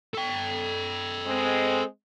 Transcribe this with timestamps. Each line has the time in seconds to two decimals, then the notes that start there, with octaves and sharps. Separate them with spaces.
0.14 A4 G5
1.26 G#3 C4